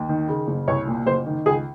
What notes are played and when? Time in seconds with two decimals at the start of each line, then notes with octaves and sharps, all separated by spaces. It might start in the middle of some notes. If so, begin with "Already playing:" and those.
Already playing: D#2
0.09 D#3
0.28 C#3
0.48 F#1
0.68 C2 C#5
0.87 A#2
1.06 F#1 C5
1.26 D#3
1.46 C#2 G#4